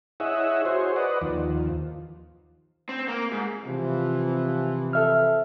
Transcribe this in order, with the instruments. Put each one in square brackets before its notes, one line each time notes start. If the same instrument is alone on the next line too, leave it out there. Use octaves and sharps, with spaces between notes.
[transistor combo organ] E4 G#4 C#5 D#5 E5 F#5
F#4 G#4 C5 C#5
B4 D5 D#5 F#5
D#2 F3
[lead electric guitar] C4
A#3
G#2
[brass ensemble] C3 E3 F3
[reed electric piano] A4 E5 F6